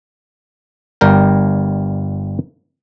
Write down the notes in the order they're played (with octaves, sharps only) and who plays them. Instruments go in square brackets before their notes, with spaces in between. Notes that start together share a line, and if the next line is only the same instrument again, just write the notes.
[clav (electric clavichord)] G1 G3 A#4 G5